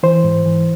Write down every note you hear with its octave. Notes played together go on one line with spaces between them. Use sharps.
E3 C5
G#2
E3